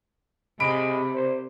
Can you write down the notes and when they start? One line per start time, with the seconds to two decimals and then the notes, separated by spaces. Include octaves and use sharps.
0.60 C3 G#3 B5 D7
1.15 C5